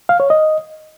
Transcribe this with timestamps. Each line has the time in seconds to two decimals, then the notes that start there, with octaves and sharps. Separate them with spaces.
0.09 F5
0.20 C#5
0.30 D#5